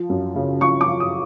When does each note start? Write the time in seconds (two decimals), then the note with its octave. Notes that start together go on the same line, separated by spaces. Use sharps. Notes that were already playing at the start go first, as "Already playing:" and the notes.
Already playing: F3
0.10 F#2
0.35 C#3
0.61 F3 C#6
0.81 D6
0.87 F3
1.00 D#6